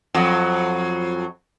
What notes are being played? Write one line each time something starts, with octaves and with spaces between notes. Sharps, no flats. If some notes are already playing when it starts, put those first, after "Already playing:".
F2 F#3